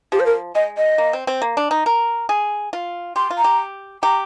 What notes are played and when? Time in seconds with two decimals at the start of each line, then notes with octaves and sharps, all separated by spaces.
0.12 F3 G4
0.20 C5
0.26 A#4
0.55 G#3 D#5
0.77 D#5
0.98 A#3
1.13 C4
1.27 C4
1.42 A#3
1.57 D4
1.71 D#4
1.86 A#4
2.29 G#4
2.73 F4
3.16 G4 C6
3.30 F4
3.38 A#5
3.44 G4
4.03 G4 A#5